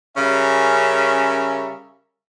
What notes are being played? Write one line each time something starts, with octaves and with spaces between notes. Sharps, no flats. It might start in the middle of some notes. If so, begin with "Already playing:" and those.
C#3 G3 C#4 A#4 E5